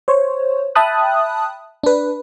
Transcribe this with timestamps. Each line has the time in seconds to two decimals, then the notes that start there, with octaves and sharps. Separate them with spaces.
0.08 C5 C#5
0.75 E5 G5 A5 B5 D#6 F#6
1.83 D4 B4